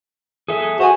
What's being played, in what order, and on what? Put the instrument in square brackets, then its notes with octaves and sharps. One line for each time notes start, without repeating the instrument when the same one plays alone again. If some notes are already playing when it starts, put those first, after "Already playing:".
[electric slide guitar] G#4 A4 E5
[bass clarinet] F#4 [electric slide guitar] C5 G#5